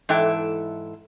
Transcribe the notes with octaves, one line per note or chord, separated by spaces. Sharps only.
G#2 E3 E4 A4 G5